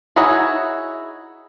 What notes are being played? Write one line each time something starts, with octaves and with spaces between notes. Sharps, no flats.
D#4 E4 F#4 G#4 C#5